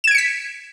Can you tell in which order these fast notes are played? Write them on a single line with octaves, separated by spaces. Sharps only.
E7 G#6 D7 C#7 B6